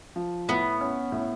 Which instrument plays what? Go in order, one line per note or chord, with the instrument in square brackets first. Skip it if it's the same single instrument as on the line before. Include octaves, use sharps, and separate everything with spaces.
[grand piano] F3
[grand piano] A2 [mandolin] B3
[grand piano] C#4
A2